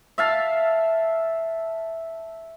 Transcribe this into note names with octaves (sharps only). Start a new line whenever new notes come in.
E5 F5 A5